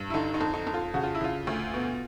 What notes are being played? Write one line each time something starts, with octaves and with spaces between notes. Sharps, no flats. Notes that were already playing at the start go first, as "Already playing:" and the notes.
Already playing: G2
E4
D3 D#4
D#4
F2
D#4
F2
F4
C#3 F#4
F4
E4
C#3 F4
D2
B2